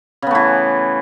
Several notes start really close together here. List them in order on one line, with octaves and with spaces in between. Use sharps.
C#3 B3 A3 E3